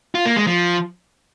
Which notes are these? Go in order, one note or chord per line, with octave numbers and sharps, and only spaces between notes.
F4
A#3
G#3
F3